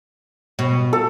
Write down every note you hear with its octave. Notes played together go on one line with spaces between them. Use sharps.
B2
A4